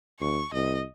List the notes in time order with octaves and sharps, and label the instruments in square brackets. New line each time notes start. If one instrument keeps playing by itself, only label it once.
[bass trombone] D2 [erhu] C#6
[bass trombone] C2 [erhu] D#5